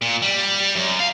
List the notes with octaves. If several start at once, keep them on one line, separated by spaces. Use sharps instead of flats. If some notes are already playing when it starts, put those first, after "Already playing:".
A#2
G3
F#2
F5